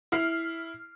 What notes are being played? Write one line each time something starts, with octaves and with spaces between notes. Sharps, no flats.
E4 F6 C7